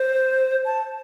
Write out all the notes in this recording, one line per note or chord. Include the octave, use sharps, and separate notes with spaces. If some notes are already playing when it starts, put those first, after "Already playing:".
Already playing: C5
A5